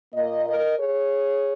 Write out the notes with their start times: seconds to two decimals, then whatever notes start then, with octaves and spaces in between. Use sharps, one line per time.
0.14 A#2 A#3 A#4 D#5
0.46 A#4 D#5
0.79 G#4 C#5